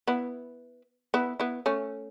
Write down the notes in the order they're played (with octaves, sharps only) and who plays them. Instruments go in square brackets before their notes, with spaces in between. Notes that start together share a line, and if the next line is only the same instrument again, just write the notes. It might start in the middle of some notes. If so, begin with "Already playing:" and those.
[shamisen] B3 E4
B3 E4
B3 E4
A3 C#4